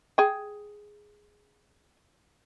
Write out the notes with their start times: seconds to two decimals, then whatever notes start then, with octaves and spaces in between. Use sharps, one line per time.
0.18 G#4 G5